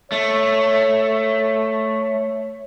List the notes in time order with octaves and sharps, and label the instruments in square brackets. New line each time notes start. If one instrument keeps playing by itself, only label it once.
[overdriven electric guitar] A3 [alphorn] C#5